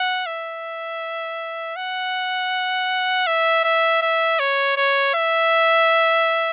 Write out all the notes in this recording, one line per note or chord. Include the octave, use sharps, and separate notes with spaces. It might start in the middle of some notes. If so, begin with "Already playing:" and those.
Already playing: F#5
E5
F#5
E5
E5
E5
C#5
C#5
E5